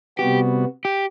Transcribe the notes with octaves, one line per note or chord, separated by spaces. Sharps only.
C3 G3 B3 F#4 G4
G4